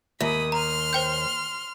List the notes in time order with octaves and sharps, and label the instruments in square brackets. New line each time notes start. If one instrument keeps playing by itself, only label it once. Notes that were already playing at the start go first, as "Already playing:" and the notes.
[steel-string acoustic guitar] D#2 [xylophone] E5 [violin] B5 D#6
[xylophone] A#5 [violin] C6 F6
[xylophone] C5 G5 G6